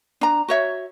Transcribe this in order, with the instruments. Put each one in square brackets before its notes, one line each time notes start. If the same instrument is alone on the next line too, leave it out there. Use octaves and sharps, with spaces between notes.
[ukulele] D4 A#5
F#4 C#5 E5